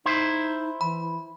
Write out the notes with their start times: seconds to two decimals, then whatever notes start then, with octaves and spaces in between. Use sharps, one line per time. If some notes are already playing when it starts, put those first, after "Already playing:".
0.06 D#4 E4 C5
0.81 E3 B5